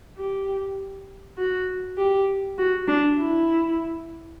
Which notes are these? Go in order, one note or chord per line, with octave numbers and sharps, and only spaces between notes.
G4
F#4
G4
F#4
D4
E4